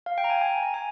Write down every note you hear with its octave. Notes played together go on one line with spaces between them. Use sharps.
F5
G5
A#5
G#5
G#5
A#5
G#5